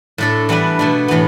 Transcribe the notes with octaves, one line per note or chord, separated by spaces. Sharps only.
A2 A3 D4 A4
E3 G3 B3 D4 B4
B2 A3 D4
A2 E3 B3